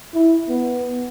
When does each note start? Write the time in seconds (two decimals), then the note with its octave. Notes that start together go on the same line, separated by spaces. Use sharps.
0.14 E4
0.49 B3